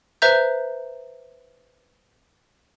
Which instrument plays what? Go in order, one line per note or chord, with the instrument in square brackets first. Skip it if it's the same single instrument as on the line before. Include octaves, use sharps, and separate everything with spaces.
[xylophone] B4 C5 E5 A#5 G6